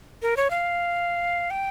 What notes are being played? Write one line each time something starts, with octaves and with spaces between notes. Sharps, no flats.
A#4
C#5
F5
G5